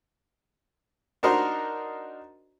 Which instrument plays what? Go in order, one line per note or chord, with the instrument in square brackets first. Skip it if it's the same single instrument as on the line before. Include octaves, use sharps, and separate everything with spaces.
[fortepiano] D4 D#4 F#4 A#4 C5 D#5